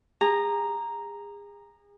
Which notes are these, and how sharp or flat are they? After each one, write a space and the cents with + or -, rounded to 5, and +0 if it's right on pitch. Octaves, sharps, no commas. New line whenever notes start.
G#4 -35 A#5 +0